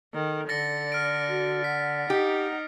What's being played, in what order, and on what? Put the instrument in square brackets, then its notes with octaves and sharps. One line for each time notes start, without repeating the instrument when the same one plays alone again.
[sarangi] D#3 [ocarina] A4
[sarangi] D3 [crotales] A6 A#6 C#7
[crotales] F6 D7
[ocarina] F#4
[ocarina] F#5 [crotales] B6
[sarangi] D#4 [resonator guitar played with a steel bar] G4